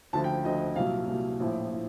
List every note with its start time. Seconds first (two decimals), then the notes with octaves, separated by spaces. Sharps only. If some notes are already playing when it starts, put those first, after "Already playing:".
0.13 D2 D3 F3 A5
0.24 G5
0.44 D2 D3 F3 D#5
0.76 C2 A#2 F#3 F5
1.07 C2 A#2 F#3
1.40 A#1 A2 F3
1.73 A2